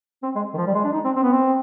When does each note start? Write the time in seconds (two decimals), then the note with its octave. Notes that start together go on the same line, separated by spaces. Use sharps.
0.23 C4
0.35 G#3
0.54 D#3
0.57 F3
0.67 G3
0.75 G#3
0.84 D4
0.93 D#4
1.05 C4
1.16 C4
1.23 B3
1.32 C4